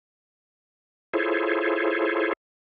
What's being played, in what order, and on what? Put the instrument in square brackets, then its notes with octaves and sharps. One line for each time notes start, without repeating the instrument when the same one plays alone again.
[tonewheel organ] E4 F4 G#4 A4 C5 C#5